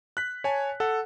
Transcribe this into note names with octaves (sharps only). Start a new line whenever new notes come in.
F#6 B6
C#5 G#5 A5
A4 F#5